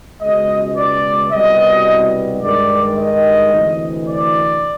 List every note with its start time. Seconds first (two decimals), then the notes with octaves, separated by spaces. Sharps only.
0.22 C#2 B2 G#3 D#5
0.77 D5
1.32 C2 B2 G3 D#5
2.43 G2 D#3 G#3 D5
2.98 D#5
3.53 D2 C3 E3
4.08 D5